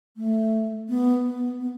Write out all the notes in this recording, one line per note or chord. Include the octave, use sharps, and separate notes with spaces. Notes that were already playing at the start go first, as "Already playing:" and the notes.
A3
B3
B3
B3